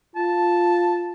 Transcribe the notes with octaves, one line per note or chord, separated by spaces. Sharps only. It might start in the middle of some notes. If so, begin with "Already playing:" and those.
F4 A5